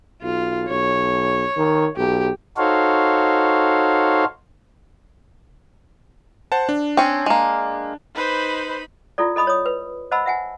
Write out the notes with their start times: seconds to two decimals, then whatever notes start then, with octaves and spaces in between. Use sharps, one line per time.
0.23 B1 F4
0.69 B1 C#5
1.57 D#3
1.97 B1 G4
2.57 D#4 F#4 A4 C5 C#5 F5
6.52 C5 F#5 A5
6.69 D4
6.97 C4 C#4
7.26 G#3 A#3
8.15 D#4 B4 C5 B5
9.18 E4 F4 A4 D5
9.36 A4 D#5 B5 D#6
9.47 C#5 D#6
9.66 B4
10.11 C5 D#5 F#5 A5 B5 E6
10.26 E5 F#5 G#5